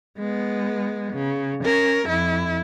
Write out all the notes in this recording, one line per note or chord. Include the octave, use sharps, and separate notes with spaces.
G#3 B3
C#3
C#4 A#4
F2 E4